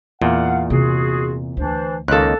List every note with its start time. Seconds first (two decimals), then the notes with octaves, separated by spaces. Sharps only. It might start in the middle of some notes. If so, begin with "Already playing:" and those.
0.21 E2 A#2 F5 F#5
0.70 C3 F4 F#4 G#4
1.57 D2 E3 D4 C5
2.08 C#2 D#3 A#3 A4 F#6